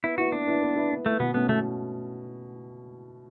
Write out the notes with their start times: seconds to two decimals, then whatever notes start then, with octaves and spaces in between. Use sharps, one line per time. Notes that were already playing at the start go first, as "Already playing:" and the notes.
0.04 B3 E4
0.18 E4 F#4 B4
0.32 B3 D4
0.47 E4 B4
0.62 B3
0.76 E4 B4
0.91 B3
1.05 A3 E4 B4
1.20 B2 B3
1.34 A3 B3 C#4
1.49 B2 A3